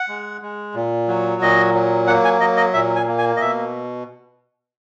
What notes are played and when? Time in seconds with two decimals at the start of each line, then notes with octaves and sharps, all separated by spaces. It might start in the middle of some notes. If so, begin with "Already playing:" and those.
Already playing: F#5
0.08 G#3
0.42 G#3
0.75 A#2
1.08 F#3
1.42 A#2 D#5
1.74 F#3
2.07 A#3 F#5
2.24 G#5
2.40 F#3 D#5
2.57 D#5
2.74 A#2 E5
2.96 G#5
3.08 A#3
3.18 G#5
3.37 D#5
3.41 B2 E5